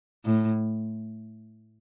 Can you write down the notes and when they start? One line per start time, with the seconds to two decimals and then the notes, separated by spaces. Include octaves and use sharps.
0.25 A2